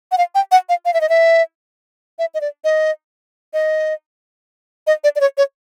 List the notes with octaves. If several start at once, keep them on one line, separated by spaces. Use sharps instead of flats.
F#5
F5
G5
F#5
F5
F5
E5
D#5
E5
E5
D#5
D5
D#5
D#5
D#5
D5
D5
C#5
C#5